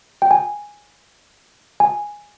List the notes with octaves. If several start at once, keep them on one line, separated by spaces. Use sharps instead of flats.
G5
G#5
G#5